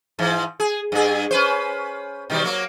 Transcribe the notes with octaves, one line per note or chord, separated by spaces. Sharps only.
G#2 E3
G#4
G2 G#4
C#4 B4 C5
B2 D#3 G3
F#3 A#3